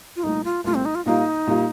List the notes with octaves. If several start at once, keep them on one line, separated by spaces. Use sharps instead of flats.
F4
C2 A#2 A3 D#4
F4
C2 A#2 A3 F4
C4
D#4
F4
A#2 G3 A#3 D#4 F4
A#2 G3 A#3 F4